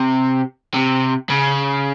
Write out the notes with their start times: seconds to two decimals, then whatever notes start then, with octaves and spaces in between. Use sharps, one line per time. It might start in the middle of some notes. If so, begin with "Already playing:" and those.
Already playing: C3
0.74 C3
1.30 C#3